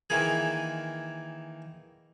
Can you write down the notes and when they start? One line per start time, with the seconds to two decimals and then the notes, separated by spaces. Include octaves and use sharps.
0.10 D#3 E3 A#3 G#4